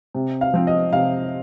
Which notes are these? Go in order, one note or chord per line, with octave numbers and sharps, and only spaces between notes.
C3
F5
F3 C4
D#5
C3 F5